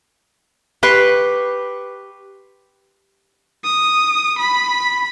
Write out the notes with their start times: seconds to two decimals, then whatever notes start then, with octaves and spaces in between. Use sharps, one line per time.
0.83 G4 B4 C6 C#6
3.65 D#6
4.39 B5